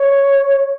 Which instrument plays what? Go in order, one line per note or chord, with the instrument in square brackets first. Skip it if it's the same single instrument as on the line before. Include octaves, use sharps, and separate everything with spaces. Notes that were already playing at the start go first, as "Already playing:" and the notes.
Already playing: [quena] C#5